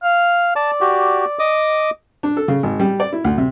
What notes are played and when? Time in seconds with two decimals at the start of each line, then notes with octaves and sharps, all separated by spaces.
0.04 F5
0.56 D5 A5
0.81 F#4 G4
1.39 D#5 D6 D#6
2.23 D4
2.37 A4
2.48 C#3
2.63 G#1
2.80 G3
3.00 D5
3.13 E4
3.24 D2
3.38 C3